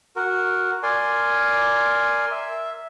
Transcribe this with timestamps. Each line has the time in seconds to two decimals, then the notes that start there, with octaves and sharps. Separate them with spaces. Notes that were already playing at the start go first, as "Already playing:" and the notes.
0.16 F#4 A#4
0.83 A#4 D5 G#5 C6
2.31 E5